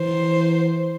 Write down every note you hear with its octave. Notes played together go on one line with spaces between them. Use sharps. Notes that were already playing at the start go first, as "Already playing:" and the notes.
Already playing: E3 C5